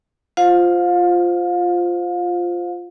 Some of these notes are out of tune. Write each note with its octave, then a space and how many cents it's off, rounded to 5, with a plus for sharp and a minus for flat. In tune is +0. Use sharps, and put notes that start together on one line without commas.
F4 +0 C5 +0 F5 +30